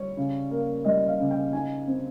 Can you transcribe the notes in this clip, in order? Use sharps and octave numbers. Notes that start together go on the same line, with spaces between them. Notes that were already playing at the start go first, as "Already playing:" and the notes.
Already playing: G3 C#5
C#3
A#3
G3 D#5
F5
C#3
G5
D#4 G#5
C4